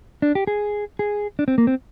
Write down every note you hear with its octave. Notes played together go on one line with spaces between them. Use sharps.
D4
G4
G#4
G#4
D4
C4
A#3
C4